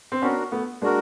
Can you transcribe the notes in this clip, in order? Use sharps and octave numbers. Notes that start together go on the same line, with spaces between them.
C4
B3 C#4 D4 F#4 A#4
A3 B3
G#3 A#3 D4 F#4 A#4